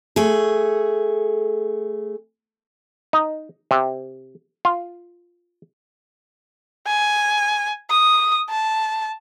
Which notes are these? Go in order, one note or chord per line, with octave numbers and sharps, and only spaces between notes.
A3 G#4
D#4
C3
F4
G#5
D#6
A5